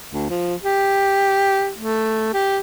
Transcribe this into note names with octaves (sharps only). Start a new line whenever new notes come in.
D2
F3
G4
A3
G4